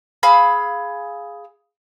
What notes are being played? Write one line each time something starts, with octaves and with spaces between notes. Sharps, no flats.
G#4 F5 B5 E6